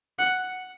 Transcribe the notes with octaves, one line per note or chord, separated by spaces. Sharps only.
F#5